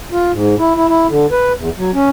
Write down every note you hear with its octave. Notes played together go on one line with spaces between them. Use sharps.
F4
G#2
E4
E4
E4
D3
B4
E2
F#3
C#4